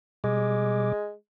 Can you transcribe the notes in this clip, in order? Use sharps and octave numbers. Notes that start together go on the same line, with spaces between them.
B2 G3 G#3 D6